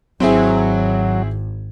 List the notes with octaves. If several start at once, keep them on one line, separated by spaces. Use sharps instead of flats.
G#1 F#3 C4 E4 G#4